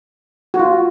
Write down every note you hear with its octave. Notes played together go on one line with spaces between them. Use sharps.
F#4
F4